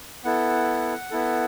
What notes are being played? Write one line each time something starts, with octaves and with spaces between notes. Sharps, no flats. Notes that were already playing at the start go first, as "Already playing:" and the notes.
B3 E4 A4 F#5
B3 E4 A4